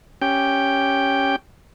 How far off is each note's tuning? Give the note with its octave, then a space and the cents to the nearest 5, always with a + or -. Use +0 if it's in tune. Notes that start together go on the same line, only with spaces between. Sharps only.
C#4 +0 G4 +0 G5 +0